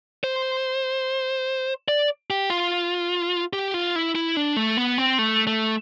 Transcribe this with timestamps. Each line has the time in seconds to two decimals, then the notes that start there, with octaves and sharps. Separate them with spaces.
0.24 C5
1.88 D5
2.30 G4
2.50 F4
3.53 G4
3.74 F4
3.96 E4
4.15 E4
4.37 D4
4.57 A3
4.77 B3
4.98 C4
5.19 A3
5.47 A3